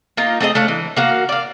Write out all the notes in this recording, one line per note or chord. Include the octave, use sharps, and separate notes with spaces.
A#3 D#4 F4
A3 C4 G#4 D#5
A3 D4 C#5 F5
E3
A#3 F#4 F5
D5 F5